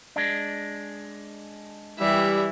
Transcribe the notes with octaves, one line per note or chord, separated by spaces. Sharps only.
G#3 D4
E3 G3 E5